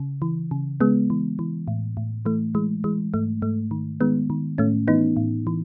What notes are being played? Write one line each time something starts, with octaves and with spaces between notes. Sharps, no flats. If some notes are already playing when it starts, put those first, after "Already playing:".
Already playing: C#3
E3
C#3
C#3 G#3 B3
E3
E3
A2
A2
E3 A3
E3 G#3
E3 G#3
G#2 A3
G#2 A3
D#3
D#3 G#3 B3
D#3
A2 A3 C#4
E3 B3 D#4
A2
E3